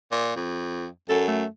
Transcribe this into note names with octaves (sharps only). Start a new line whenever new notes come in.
A#2
F2
F#2 A4
A3